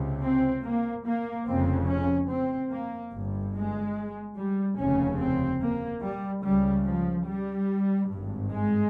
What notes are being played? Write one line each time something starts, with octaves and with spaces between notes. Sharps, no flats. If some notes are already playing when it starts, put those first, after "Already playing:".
Already playing: C#2 C3
C4
A#3
A#3
F1 F2 C#3 C4
C#4
C4
A#3
G1 G2
G#3
G3
F1 D#2 C#3 C#4
C4
A#3
G3
C#2 C#3 G3
F3
G3
G#1 G2
G#3